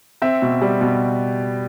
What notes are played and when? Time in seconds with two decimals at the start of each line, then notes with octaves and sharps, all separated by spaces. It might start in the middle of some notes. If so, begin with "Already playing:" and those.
0.22 C4 E5
0.42 B2
0.62 G3
0.81 B2